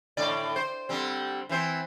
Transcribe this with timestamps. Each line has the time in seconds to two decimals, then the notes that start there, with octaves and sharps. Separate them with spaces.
0.17 A2 D3 D5
0.56 C5
0.89 D3 G3 C4
1.49 E3 C4 C5